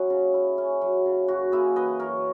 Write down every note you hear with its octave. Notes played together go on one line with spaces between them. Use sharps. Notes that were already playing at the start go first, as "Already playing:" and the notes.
Already playing: F#3 C#4 E4 G#4
C#3
E4
C#4
F#3
C#3
F#2 F#4
A#3 E4 G#4
E3 B4 D#5
F#2 A#4 C#5